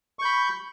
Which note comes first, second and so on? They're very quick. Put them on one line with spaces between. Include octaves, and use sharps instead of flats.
C#6 G6 B5